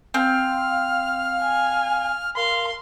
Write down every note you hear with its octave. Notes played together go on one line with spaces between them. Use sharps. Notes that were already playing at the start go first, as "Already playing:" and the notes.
C4 F5 F6
G#5
A#4 F5 C6